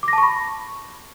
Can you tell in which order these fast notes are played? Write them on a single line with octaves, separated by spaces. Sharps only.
D6 A#6 A5 C#6 B5